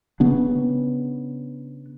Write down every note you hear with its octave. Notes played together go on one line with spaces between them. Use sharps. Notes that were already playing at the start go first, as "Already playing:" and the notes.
C#3 B3 D4